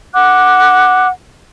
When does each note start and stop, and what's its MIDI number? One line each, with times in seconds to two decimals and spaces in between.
0.14 1.08 78
0.14 1.08 86
0.14 1.08 90